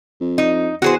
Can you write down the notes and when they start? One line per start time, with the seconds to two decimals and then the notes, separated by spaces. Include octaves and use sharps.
0.20 F2
0.38 D#4
0.82 E2 F#4 G#4 C5